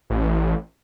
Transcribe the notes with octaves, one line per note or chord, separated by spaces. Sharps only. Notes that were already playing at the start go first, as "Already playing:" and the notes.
A1